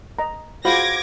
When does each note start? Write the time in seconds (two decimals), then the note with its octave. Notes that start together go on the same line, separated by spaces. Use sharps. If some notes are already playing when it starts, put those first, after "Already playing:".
0.19 D#5 A#5
0.65 F4 F#4 G#4 C5 B5 D6 G#6 A#6